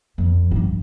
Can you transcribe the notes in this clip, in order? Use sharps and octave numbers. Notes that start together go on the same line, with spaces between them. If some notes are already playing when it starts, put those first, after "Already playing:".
F2
A2
G2